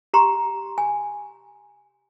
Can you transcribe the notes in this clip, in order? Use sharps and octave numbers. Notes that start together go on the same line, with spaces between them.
G4 A#5 C6
G#5